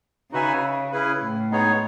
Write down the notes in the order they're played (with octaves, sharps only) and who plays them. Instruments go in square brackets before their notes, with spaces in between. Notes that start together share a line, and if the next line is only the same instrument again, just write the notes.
[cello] C#3 [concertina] D#4 F#4 B4 E5 G#5
[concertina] C#4 E4 G#4 B4
[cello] A2
[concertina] G#3 B3 D#4 G#4 C#5